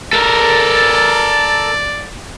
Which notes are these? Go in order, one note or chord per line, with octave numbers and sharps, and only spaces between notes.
A4 A#4 D5